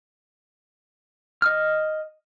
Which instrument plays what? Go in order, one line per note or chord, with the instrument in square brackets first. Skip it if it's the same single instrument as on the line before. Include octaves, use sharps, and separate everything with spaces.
[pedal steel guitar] D#5 D#6 F6